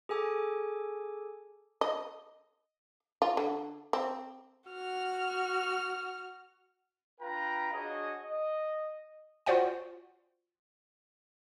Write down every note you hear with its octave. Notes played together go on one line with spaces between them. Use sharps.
G#4 A4 G#5 D6
D#5
F4
D3
C4
F#4 F6
D4 F4 B4 F5 G5 A#5
D4 F#4 G#4 C#5 D#5
D#5
F4 F#4 C5 D5 F#5 G5